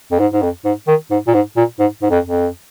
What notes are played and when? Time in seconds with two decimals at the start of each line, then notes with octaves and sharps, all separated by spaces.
0.12 F2
0.20 G#2
0.33 G#2
0.42 F2
0.65 G#2
0.88 D#3
1.11 G#2
1.27 A#2
1.34 G#2
1.57 A#2
1.79 G#2
2.02 G#2
2.10 F2
2.27 F2